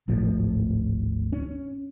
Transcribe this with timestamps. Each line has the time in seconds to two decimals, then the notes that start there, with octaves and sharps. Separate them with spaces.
0.08 D1 G#1 A2 F3
1.32 C#4